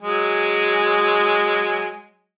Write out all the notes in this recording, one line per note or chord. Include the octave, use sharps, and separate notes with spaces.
F#3 G#3 G#5